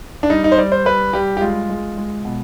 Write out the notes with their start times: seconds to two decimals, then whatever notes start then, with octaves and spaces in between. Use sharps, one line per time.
0.23 D4
0.30 G3 D#4
0.44 D#4
0.52 C5
0.58 G3 D5
0.72 C5
0.85 G3 B4
1.13 G3 G4
1.37 G4
1.41 G#3 F4
1.69 G#3
1.97 G#3
2.25 B2